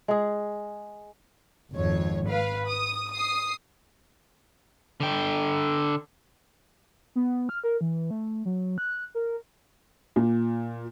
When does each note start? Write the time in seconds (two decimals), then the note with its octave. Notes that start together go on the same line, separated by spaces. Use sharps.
0.08 G#3 G#4
1.73 G#1 F2 C#5
2.28 B4 F5
2.68 D#6
3.13 D#6 C7
5.00 D3 G5
7.16 B3
7.49 F6
7.64 A#4
7.81 E3
8.11 A3
8.45 F#3
8.78 F#6
9.15 A#4
10.16 A#2